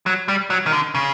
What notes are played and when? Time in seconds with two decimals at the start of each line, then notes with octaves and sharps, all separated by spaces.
0.06 F#3
0.28 G3
0.50 F#3
0.66 D#3
0.72 D3
0.95 C#3